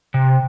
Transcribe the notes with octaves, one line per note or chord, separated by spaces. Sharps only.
C3